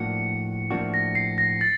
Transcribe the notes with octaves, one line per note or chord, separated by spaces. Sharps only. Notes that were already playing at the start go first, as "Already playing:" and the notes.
Already playing: A2 F3 A#3 D4 F#4 C#7
A2 F3 A#3 D4 F#4
A#6
C7
A#6
A6